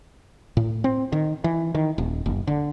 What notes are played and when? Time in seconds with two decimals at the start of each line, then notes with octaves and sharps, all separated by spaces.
0.57 A2
0.84 C4
1.12 D#3
1.44 E3
1.75 D#3
1.98 D#1
2.26 F#1
2.47 D3